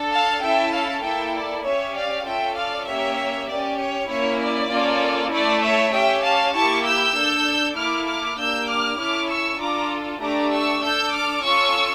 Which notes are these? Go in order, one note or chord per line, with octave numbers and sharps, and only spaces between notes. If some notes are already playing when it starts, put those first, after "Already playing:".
Already playing: D4 A4
F5 A5
C#4 E4 A4 E5 G5
F5 A5
A#3 E4 A4 E5 G5
D5
C#4 G4 C#5 E5
D5 F5
C#4 F4 A4 E5 G5
D5 F5
A#3 C#4 G4 C#5 E5
C#4 G4 D5
C#5
A#3 C#4 E4 C#5
D5
A#3 C#4 F4 A4
A3 E4 A4 D5
C#5 E5
C#4 G4 E5 G5
F5 A5
A#3 E4 G4 A5 C#6
E6 G6
D4 A4
A#3 E4 A4 D6 F6
D6 F6
A#3 D4 G4 E6 G6
D6 F6
C#4 E4 A4 D6 F6
C#6 E6
D4 F4 A4 A#5 D6
A3 D4 G4 A#5 D6
C#6 E6
D4 A4 E6 G6
D6 F6
C#4 F4 A4 C#6 E6